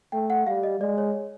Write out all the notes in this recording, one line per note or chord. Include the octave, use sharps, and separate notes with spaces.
A3 G5
F#5
G3 F5
D#5
G#3 D5
C#5